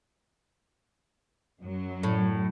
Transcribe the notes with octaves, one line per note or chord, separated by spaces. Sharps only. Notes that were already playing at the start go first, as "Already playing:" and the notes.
F#2 F#3
A2